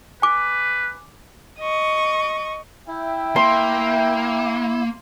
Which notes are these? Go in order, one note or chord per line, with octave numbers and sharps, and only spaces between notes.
B4 G#5 D6
D#5 C#6
E4 E5 G5
A#3 C6